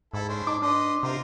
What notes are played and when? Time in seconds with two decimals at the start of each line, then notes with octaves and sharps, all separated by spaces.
0.14 G#2 E4 A4
0.28 C#4 D4 C5
0.47 D#4 D6
0.62 D4 B4 D#5 C6
1.03 C3 F4 A#4 C5